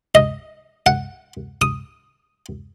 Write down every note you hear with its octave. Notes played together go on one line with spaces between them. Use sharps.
D#5
F#5
D#6